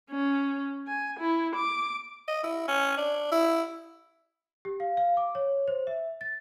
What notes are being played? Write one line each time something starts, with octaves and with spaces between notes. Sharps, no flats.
C#4
G#5
E4
D6
D#5
E4
C#4
D4
E4
G4
F5
F5
D6
C#5
C5
E5
A6